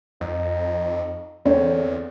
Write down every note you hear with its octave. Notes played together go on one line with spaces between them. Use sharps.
F2 D#4
E2 D3 C4 C#5